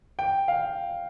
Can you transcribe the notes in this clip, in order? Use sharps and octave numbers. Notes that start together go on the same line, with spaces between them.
G5
F5